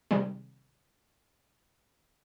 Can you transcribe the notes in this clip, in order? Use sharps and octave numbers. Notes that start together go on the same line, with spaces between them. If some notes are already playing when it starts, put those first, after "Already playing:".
C3 D#3 G3 G#3